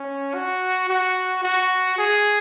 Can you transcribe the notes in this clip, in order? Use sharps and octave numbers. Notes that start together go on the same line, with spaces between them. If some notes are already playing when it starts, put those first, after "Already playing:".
Already playing: C#4
F#4
F#4
F#4
G#4